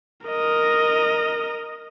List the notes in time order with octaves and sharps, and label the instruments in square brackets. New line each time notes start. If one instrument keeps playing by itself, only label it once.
[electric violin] A#4 D#5